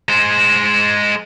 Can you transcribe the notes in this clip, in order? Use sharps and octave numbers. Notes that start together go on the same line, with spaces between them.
G#3 C5